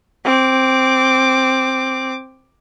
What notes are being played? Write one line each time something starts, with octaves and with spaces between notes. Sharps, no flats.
C4 D6